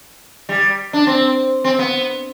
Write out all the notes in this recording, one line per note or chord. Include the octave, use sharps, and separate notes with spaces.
G3
D4
C4
C4
B3